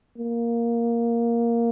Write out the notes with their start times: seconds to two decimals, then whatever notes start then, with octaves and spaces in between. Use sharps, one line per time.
0.18 A#3